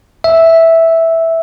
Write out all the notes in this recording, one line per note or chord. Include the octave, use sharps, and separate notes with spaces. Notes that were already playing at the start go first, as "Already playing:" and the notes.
E5